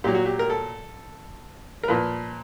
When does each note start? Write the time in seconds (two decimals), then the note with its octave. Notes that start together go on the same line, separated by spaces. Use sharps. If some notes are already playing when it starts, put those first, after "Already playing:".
0.04 A#2 F#3 G4
0.15 F#4
0.26 G4
0.39 A#4
0.50 A4
1.83 A#4
1.88 A#2 F3 B4